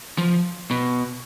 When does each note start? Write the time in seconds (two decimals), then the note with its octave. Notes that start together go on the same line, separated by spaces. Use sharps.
0.18 F3
0.71 B2